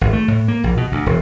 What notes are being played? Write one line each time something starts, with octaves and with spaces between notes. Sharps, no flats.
G#1
A3
A2
A#3
A#1
B2
D2
E1